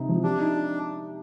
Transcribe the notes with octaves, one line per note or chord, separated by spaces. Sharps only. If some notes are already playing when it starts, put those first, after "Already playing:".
Already playing: C3 C4 D#4
F3
D4 G4
D#4